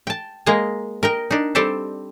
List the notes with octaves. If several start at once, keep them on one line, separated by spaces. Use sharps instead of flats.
G5 A5
G#3 A#3 D#5 A#5
A#4 D#5 G5
D4 D#4
G3 C4 G4 A4 C5